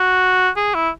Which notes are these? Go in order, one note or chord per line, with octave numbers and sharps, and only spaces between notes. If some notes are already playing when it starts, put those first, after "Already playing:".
Already playing: F#4
G#4
E4